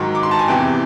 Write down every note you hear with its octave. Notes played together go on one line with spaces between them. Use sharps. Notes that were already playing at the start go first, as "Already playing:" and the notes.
Already playing: G#2 D#3 F#3
D6
C6
A5
G#5
E2 C3 E3 G5